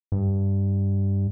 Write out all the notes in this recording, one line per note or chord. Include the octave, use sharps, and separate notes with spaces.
G2